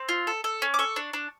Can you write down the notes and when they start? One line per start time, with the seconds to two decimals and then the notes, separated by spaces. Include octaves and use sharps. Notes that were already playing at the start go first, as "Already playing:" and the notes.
Already playing: C4
0.09 F4
0.27 A4
0.44 A4
0.62 C#4
0.74 D6
0.79 A4 C#6
0.96 D4
1.13 D4